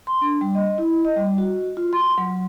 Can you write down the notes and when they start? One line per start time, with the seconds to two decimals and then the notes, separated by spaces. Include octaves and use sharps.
0.07 C6
0.21 D4
0.41 G3
0.55 D#5
0.78 E4
1.05 D#5
1.17 G3
1.38 F#4
1.77 F4
1.93 C6
2.18 F#3